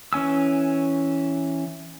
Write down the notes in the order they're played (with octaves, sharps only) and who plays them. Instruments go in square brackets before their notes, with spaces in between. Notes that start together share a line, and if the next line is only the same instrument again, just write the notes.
[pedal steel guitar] E3 C#4 G#5 E6